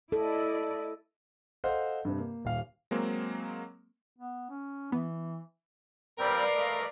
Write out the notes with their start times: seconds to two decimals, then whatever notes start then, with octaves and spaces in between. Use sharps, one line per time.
0.12 E4 A4 D5 D#5
1.64 A4 C5 D#5 F5 F#5
2.05 G2 C3
2.19 A#3
2.45 D#1 F5
2.91 F#3 G#3 A#3 C4
4.19 B3
4.50 C#4
4.92 E3 B3
6.19 G3 C4 A#4 B4 D5 F5 G5
6.55 A3 D#5